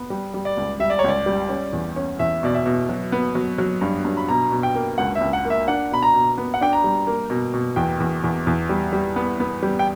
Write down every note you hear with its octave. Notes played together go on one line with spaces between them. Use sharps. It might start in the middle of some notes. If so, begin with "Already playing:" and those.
Already playing: B3
G3
G3
D5
C#2
G3 E5
D5
C#5
C#2 D5
G3
C#4
E2
C#4
E2 E5
B2 D5
E5
B2
F#3
B3
F#3
F#3
G2
G2
B5
B2 A#5
B2
G5
A#3
C#2 F#5
E5
C#2
F#5
A#3
E5
D4 F#5
B2 B5
A#5
B2
B3
F#5
D4 G5
A#5
G3
A#3
B2
B2
E2 G5
E2
E2
E2
G3
G3
B3
B3
G3
G5